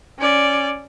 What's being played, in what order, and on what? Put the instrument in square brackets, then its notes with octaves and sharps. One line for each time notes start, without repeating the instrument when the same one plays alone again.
[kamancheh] C#4 D5